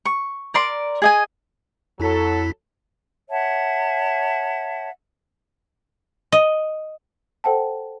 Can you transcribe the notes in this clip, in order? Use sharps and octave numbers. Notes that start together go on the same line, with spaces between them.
C#6
A#4 D5 C6
G#4 D#5 G#5
F2 F#3 E4 A4 B6
C#5 E5 F#5 A5
D#5
A4 C5 F#5 G5 A5